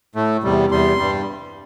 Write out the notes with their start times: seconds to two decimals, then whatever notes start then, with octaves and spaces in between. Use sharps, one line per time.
0.15 A2 A3
0.44 E2 C3 G3
0.71 E2 C3 G3 C6
0.99 G2 G3